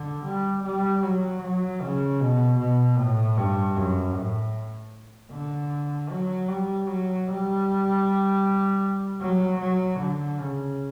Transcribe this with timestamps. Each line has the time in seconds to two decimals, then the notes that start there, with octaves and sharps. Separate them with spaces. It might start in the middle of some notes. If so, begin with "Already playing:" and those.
Already playing: D3
0.25 G3
0.63 G3
1.02 F#3
1.41 F#3
1.81 C#3
2.20 B2
2.58 B2
2.97 A2
3.36 G2
3.76 F#2
4.14 A2
5.31 D3
6.09 F#3
6.48 G3
6.87 F#3
7.27 G3
9.21 F#3
9.60 F#3
9.99 D3
10.38 C#3